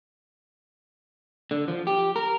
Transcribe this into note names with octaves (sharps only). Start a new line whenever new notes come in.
D3
F3
G4
A#4